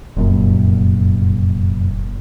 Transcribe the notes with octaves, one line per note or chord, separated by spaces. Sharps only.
F1 F#2 A#2